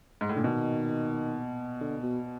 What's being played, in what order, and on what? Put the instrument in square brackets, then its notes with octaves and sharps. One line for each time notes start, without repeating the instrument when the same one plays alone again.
[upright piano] G#2
A2
[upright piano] A#2 [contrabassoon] D3
[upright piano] B2 [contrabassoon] D#3
[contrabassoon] D3
B2